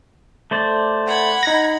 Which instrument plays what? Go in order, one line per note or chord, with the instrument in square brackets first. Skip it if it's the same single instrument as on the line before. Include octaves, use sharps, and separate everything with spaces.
[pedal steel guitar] A3 C5 D5
[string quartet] F#5 B5 G#6
[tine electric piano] D#4 A#6